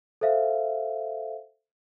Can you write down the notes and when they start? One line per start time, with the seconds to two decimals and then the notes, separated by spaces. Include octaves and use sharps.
0.21 A4 C5 E5 F5